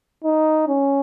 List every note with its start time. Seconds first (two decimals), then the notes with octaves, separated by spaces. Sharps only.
0.24 D#4
0.68 C#4